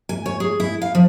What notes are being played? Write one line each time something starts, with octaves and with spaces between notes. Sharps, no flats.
G#5
C#5
G#4
E4
F5
F3